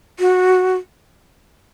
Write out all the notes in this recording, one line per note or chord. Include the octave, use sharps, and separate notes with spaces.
F#4